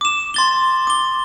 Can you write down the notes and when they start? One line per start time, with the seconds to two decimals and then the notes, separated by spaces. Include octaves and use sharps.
0.01 D6 E7
0.34 C6 A6 G7
0.87 D6 G7